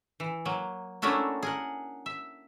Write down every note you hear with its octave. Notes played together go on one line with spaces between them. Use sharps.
E3
F#3 A#3
A3 A#3 C#4 D4 E4 F#4
G#4 A#4 F#5
E5